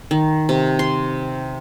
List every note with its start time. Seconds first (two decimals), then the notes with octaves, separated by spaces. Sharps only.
0.11 D#3
0.49 C3
0.79 C6